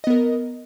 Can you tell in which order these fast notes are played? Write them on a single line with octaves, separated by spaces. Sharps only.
D#5 B3 A#4